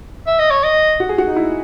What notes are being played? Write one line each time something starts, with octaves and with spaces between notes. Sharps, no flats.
E5
D#5
C#5
D#5
F#4
G#4
F#4
D#4
E4